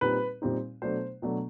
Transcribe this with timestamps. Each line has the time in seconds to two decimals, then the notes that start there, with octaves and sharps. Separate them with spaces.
0.01 A#2 G3 C4 D#4 B4
0.42 A#2 G3 C4 D#4
0.82 B2 F#3 A3 D4 C5
1.22 B2 F#3 A3 D4